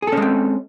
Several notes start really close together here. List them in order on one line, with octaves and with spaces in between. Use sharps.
G#4 A4 C#4 G#3 C4